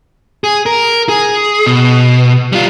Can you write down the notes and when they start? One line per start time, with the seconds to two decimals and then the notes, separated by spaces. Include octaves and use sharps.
0.44 G#4
0.66 A#4
1.09 G#4
1.66 B2
2.52 G3 F4